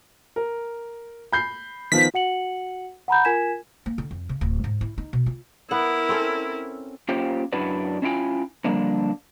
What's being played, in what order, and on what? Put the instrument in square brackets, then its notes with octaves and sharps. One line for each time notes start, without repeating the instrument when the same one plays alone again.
[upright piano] A#4
B5 G6 C7
[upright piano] D#3 F3 B3 [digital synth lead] B6
[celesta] F#4 F#5 C#7 F#7
F#5 A#5 B5 G6
F4 A#4 G#5 G#6 B6 E7
[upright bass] A#3
D3
F2
C#3
D1
G#2
E4
D#4
B2
F4
[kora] B3 F#5 [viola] E4 A#4
[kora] C4 C#4 A4
[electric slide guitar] A#3 C#4 F4 G4 C5 G5
F#2 D4 E4 F#4 B4 D5
C#4 D4 E4 F4 G5 G#5
D3 F3 G3 A#3 D4